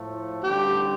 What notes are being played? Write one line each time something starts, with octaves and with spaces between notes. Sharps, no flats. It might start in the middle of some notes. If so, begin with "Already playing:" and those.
Already playing: A2 F3 A3
A1 G2 D3 G3 G4